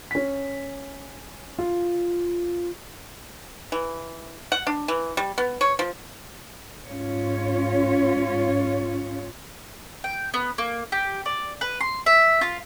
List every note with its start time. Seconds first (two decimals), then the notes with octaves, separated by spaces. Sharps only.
0.11 C#4 B6
1.58 F4
3.72 E3
4.52 F#5
4.67 D4
4.88 E3
5.17 G3
5.38 B3
5.61 C#5
5.79 F3
6.88 G#2 C#4 F4 C#5
10.04 G5
10.34 B3
10.58 A#3
10.92 G4
11.26 D5
11.61 B4
11.80 C6
12.06 E5
12.41 F4